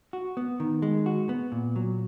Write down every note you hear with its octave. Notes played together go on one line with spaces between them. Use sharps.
F#4
B3
D#3
G#3
F#4
B3
A#2
F#3